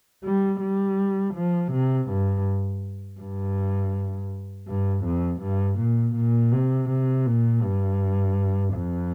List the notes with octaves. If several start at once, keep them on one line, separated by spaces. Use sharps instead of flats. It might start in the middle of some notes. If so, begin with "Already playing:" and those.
G3
G3
F3
C3
G2
G2
G2
F2
G2
A#2
A#2
C3
C3
A#2
G2
F2